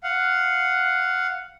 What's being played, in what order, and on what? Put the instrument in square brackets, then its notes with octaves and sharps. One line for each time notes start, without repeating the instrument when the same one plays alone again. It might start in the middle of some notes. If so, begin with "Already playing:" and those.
[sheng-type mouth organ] F5 F#5